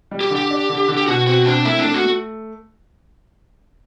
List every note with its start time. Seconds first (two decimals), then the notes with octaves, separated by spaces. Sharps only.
0.11 G3
0.21 G4
0.30 D3
0.36 G4
0.50 D4
0.69 D3
0.88 D3
0.97 G4
1.07 B2 F#4
1.27 C4 F#4
1.46 C4 D4
1.65 A3 E4
1.79 A3 D4
1.94 F#4
2.03 A3